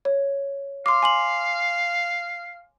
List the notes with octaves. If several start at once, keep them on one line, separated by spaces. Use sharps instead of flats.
C#5
F5 C6 D6
G#5 C6 F#7